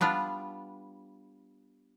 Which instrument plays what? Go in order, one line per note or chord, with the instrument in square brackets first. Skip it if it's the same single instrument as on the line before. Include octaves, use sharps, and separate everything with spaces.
[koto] G3 B3 D4 F4